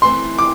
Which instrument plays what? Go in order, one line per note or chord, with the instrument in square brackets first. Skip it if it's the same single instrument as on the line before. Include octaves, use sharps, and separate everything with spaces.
[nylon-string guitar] E3 A3 C4 [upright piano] C6
[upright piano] D6